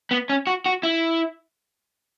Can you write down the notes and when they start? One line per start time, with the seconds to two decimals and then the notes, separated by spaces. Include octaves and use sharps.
0.11 B3
0.30 C#4
0.47 F#4
0.66 F#4
0.83 E4